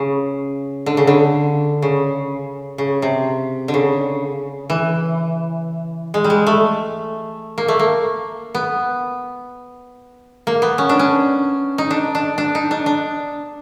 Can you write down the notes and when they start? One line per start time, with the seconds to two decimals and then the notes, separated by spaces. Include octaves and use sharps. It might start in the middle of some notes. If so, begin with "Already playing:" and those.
Already playing: C#3
0.86 D3
0.97 C#3
1.07 D3
1.82 C#3
2.78 C#3
3.02 C3
3.68 D3
3.74 C#3
4.70 E3
6.14 G#3
6.24 G3
6.30 G#3
6.47 A3
7.58 A#3
7.68 A3
7.79 A#3
8.55 B3
10.47 A#3
10.62 B3
10.78 C#4
10.89 D4
10.99 C#4
11.78 D#4
11.90 D4
12.15 D4
12.38 D4
12.55 D#4
12.71 D4
12.86 D4